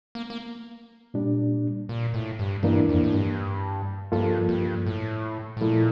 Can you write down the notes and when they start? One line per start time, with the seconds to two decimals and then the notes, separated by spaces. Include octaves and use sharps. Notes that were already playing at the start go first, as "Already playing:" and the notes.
0.15 A#3
0.30 A#3
1.14 A#2 G3 D4
1.89 A#2
2.14 A2
2.39 G2
2.63 G2 E3 A#3 D4
2.89 F2
3.04 A2
3.12 G2
4.12 G2 F3 A#3 F4 A4
4.49 G2
4.86 A2
5.57 A2
5.61 A#2 F3 A3 E4 A4